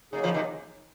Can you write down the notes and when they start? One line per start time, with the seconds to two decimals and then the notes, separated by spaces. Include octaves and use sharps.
0.12 C#3 F#3 A#3 D#4 G#4
0.23 C#3 F3
0.34 C3 D#3